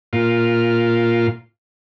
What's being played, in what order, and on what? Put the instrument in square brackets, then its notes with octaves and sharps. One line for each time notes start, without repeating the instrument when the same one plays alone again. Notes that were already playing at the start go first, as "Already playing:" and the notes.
[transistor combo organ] A#2 F4